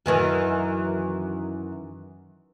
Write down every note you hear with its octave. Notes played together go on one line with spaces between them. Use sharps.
F#2 D#3 E3